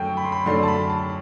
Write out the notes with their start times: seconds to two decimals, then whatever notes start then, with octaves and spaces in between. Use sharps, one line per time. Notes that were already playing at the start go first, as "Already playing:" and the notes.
Already playing: F#2 D3 A3 G5
0.17 B5
0.24 C6
0.32 B5
0.46 F#2 D3 A3 D4 C6
0.63 A5
0.68 B5
0.89 A5